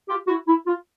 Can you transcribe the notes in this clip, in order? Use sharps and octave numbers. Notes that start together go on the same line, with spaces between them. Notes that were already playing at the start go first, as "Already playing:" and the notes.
F4 G4
E4 F#4
E4
F4